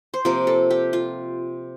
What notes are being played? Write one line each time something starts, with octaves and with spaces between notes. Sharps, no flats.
C5
C3 F3 A#3 A#4
A4
G4
F4